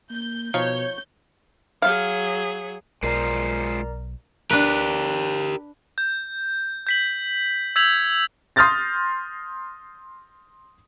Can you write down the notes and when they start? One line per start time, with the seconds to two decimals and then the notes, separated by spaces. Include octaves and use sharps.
0.10 A#3 G6
0.54 B2 F3 D#4 C#5 F5
1.82 F#3 G#4 F5
3.03 B1 G#3 F4 A#4 C5 D5 A#5
4.51 D4 G4 A#4 B4
5.98 G6
6.87 G6 B6 F#7
7.76 E6 G6 G#6 B6 F7 F#7
8.56 C6 D#6 F6 G6 A6 A#6